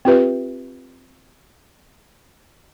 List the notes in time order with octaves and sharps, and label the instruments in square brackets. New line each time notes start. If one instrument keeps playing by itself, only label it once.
[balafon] C4 F4 G4 B4 E5